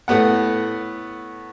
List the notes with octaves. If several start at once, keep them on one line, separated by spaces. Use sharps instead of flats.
A2 A3 B3 F#5